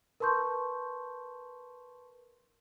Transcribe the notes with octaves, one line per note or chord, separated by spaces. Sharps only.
A#4 B4 A5 C6 C#6 G6